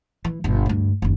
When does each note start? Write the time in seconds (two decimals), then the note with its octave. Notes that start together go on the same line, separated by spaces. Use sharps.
0.24 E3
0.44 G1 B2
0.66 D2 G2
1.02 F#1 D#2